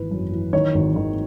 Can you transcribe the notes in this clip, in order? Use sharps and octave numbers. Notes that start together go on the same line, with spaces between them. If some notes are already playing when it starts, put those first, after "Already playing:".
Already playing: G#1 E3 B4
F#2
E3
D#3 C#5
G#1
D#3